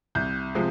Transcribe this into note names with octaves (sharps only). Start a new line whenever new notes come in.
C2 G6
C3 F3 G#3